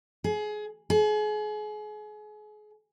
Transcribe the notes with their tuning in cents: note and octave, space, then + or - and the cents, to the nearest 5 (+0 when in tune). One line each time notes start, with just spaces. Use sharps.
G#4 +25
G#4 +35